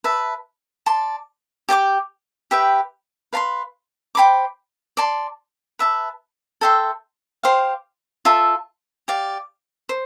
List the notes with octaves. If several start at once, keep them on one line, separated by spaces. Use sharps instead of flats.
B4 E5 A5
D5 A5 C6
G4 D5 G5 D6
G4 B4 E5 G5
B4 F5 A5 C6
C5 G5 B5 D6
D5 A5 C6
B4 E5 A5
A4 E5 G5 C6
G4 C5 F5 C6
F4 A4 E5 A5
G4 D5 F5
C5